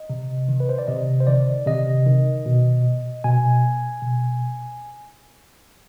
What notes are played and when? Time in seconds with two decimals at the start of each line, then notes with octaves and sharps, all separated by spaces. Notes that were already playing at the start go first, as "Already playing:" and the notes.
Already playing: D#5
0.10 C3
0.49 D#3
0.60 B4
0.69 C5
0.79 D5
0.88 C3 D#5
1.20 C5
1.27 D#3 D5
1.66 C3 D#5
2.06 D#3
2.46 B2
3.24 B2 G#5
4.02 B2